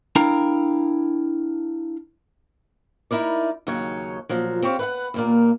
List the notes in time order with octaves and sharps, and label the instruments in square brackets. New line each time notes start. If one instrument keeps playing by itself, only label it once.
[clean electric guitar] D4 E4 A#4 F5 G5 A#5
[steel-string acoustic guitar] D#4 E4 A#4 D5
D#2 C#3 F#3 D#4 C#5
A#2 F3 F#3
C4 G4 C5 C#5 D#5 F5
B4 E5 F#5
D#2 A#2 A#3